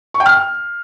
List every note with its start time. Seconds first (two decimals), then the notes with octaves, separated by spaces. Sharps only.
0.14 C#6
0.20 G5
0.26 F6